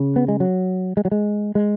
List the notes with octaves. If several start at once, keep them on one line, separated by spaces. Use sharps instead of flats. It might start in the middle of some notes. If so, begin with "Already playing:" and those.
Already playing: C#3
B3
G#3
F#3
G#3
F#3
G#3
G#3